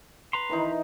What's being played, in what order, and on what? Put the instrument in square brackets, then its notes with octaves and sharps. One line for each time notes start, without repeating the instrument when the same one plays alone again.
[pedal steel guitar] B4 A#5 C6
[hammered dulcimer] D#3 E3 D#4